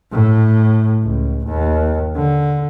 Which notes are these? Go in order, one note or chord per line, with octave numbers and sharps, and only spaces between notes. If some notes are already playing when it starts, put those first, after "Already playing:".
A2
C#2
D#2
D3